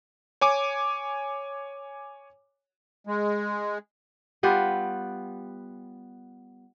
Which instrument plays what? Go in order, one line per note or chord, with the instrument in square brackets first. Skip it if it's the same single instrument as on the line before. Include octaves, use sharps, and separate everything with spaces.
[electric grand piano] C#5 G#5 D6
[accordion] G#3
[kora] G3 B3 F4 G4